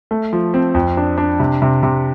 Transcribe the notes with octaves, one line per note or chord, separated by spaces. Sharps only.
A3
F3
C4
F2
D4
D4
C3
C3
C3